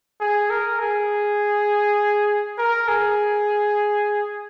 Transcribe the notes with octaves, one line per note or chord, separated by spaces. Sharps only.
G#4
A#4
G#4
A#4
G#4